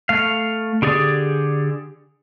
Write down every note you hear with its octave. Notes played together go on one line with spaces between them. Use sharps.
A3 F5
D3 G4 G#4 D5